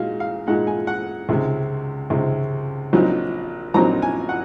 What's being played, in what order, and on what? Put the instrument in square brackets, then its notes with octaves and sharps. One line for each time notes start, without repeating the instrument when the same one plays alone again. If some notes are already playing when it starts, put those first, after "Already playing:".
Already playing: [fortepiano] A#2 G#3 D#4 F#4 F5
F5
A#2 G#3 D#4 F#5
G#5
F#5
C#2 C3 D#3 G#3
C#2 C3 D#3 G#3
A#1 A#2 F#3 C4 D#4
A#1 A#2 F#3 C4 D#4 A#5
G#5
F#5